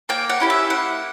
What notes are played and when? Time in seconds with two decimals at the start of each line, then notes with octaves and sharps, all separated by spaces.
0.09 A#3 G5
0.30 F#5
0.40 C#4 E4 G4
0.50 E5
0.70 A#3 F#5